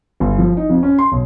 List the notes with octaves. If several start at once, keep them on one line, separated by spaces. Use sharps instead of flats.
G1
F3
D#4
F2
C#4
C6
B1